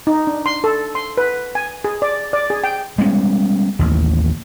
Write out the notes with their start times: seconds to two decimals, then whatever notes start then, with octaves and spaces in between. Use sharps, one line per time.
0.07 D#4
0.27 D4
0.46 C6
0.64 A4
0.95 C6
1.17 B4
1.55 G#5
1.85 G#4
2.02 D5
2.33 D5
2.50 G#4
2.64 G5
2.98 G3 G#3 B3 C#4
3.79 A1 D#2